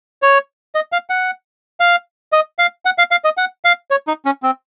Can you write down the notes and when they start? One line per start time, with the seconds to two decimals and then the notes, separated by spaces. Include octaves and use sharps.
0.22 C#5
0.75 D#5
0.92 F5
1.10 F#5
1.80 F5
2.32 D#5
2.59 F5
2.85 F#5
2.98 F5
3.11 F5
3.24 D#5
3.37 F#5
3.65 F5
3.91 C#5
4.08 D#4
4.25 C#4
4.43 C4